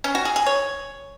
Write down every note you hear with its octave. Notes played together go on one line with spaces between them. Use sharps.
C#4
F#4
G#4
G#4
C#5